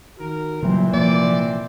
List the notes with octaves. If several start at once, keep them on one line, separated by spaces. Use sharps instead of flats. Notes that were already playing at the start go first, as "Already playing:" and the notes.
D#3 F#4 A#4
A#2 C#3 E3 F#3 G3 C4
C3 F3 A#3 D5